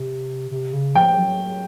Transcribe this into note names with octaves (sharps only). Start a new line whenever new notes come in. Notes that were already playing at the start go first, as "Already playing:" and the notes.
Already playing: C3
C3
C#3
F3 G5
F#3